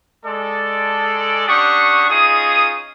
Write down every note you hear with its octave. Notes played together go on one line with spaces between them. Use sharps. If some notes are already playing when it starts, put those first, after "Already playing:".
G#3 A4 D5
C#4 D4 G4 F#5 C#6 D#6
C#4 D#4 F4 G#4 D#6